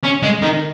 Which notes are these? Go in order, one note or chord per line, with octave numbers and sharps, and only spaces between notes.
C#4
G#3
D#3